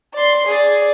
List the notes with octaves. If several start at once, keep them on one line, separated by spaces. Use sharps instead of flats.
D5 C6
G#4 D5